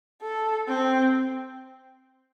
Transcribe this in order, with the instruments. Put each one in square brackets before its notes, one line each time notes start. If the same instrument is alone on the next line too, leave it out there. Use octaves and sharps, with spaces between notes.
[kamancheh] A4
C4